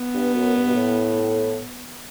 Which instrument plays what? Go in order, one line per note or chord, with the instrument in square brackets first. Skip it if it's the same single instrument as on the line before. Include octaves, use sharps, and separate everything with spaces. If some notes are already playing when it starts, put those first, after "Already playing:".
Already playing: [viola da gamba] B3
[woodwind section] G2
F#2
G2
B2
A2